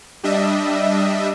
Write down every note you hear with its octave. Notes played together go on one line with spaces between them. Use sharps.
G3 D4 D#5 E5